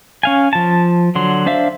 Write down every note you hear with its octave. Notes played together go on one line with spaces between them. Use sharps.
C#4 F5 G#5
F3 A5
D3 F#3 C6
D4 C5 E5 F5